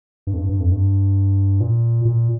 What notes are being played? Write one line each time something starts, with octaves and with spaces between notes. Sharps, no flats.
G2
F2
G2
G2
F2
G2
A#2
A#2